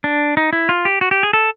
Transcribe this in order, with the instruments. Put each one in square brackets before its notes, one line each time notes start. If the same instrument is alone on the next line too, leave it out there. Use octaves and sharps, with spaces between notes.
[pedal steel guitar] D4
D#4
E4
F4
G4
F#4
G4
G#4
A4